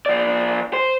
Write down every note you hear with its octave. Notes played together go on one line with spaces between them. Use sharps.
F3 D5
C5